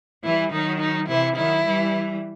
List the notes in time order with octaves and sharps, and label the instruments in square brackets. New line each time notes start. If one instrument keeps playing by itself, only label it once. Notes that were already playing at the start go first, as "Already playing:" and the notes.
[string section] E3 G3 [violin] E4
[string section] D#3 F#3 [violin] D#4
[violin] D#4
[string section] C3 E3 [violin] E4
[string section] D#3 F#3 [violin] E4
[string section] E3 G3